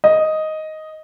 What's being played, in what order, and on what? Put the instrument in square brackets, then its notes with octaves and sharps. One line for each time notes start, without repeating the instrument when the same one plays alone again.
[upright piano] D#5